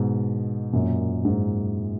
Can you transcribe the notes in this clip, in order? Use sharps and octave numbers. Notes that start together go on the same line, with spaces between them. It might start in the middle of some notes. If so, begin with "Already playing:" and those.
Already playing: G#2 B2
F#2 A#2
G#2